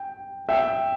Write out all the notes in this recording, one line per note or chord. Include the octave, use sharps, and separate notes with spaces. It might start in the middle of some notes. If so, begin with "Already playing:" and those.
Already playing: G5
E5 G5